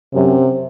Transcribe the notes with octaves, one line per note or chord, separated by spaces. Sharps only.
F#2 C3